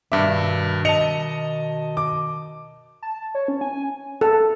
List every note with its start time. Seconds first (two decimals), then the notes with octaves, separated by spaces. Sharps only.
0.12 G2 B2 D#3 E5 D6
0.85 D#5 A5 C#7 F7
1.97 D6
3.03 A5
3.35 C#5
3.48 C#4
3.61 G#5
4.21 A4